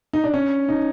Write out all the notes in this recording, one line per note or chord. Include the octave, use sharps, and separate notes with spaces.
D#4
D4
C#4
D#4